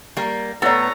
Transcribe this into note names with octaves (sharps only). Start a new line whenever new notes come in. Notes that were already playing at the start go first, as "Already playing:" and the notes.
G3 A#3 G5 A#5
A2 B3 E4 A4 C#5 D5 A#5 C#6